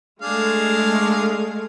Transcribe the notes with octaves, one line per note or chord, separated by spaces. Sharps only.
G#3 A3 D4 G#4 F5